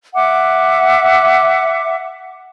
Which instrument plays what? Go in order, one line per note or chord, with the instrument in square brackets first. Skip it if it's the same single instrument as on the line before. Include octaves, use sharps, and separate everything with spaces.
[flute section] E5 F#5 D6